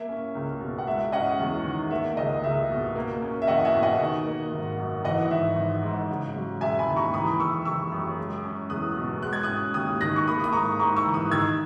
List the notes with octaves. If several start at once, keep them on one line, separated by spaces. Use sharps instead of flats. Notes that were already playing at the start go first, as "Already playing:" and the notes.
Already playing: A#3 E5
C#4
C#2
B2
F#5
G#3 E5
C#4 D#5 F#5
E2
D#3
A#3 E5
C#2 D#5
C#2 E5
B2
A#3
C#4
E5
E2 D#5 F#5
F#5
E5 G#5
B2
D#5 F#5
D#3
A#3
G#1
F#2
E3 D#5 F#5
G#1 E5
G#1
G#2
C#3
F#3
E1 E5 G#5
G#5 B5
D#2
A#5 C#6
E3 B5 D#6
F#1 C#6 E6
F#1 C#6 E6
F#2
G#3
C#4
E2 D#6 F#6
B2
G#3 F#6
G#6
C#4 D#6 F#6
D#2 D#6 F#6
D#3 F#6 A#6
C#6
A#3 B5 D#6
D#6
G#2 A#5 C#6
G#2 A#5 C#6
C#6 E6
E3
D#6 F#6
D#3 E6 G#6